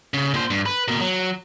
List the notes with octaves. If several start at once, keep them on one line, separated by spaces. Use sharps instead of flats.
C#3
A#2 C5
G2
B4
B2 A#3
F#3